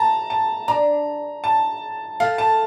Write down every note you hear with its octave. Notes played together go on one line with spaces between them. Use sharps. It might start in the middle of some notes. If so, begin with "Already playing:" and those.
Already playing: A#3 A5 A#5
A5
D4 A#5
A5
A3 F5
A5